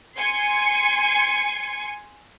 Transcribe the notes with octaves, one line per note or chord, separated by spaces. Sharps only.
G#5 C6 G#6 C#7